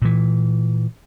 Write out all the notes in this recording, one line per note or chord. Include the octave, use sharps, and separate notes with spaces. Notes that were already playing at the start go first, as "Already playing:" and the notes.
A#2 E3